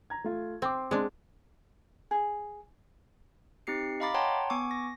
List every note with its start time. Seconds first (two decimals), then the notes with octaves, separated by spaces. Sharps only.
0.10 A#5 G#6
0.24 A3 F4
0.62 C4 C5 C6 D6
0.91 G#3 C4 D4 C6
2.11 G#4
3.67 C4 D#4 G4 C7 C#7
4.00 D#5 F5 A#5 B5 D6 A6
4.14 C#5 F#5 G5 A5 A#5 C6
4.50 B3 G#5 C#6 D6
4.71 A#6